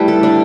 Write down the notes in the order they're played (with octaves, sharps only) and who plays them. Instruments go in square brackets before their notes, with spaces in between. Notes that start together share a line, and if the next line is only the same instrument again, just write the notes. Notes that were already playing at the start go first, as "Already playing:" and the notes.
Already playing: [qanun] G3 A3 E4 B4
A4
D4